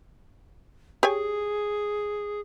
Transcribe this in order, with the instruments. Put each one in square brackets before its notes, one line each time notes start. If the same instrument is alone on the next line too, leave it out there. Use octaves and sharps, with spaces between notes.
[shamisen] G4 C#5 G#5 [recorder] G#4